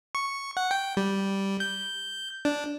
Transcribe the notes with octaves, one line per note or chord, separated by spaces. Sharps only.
C#6
F#5
G5
G3
G6
D4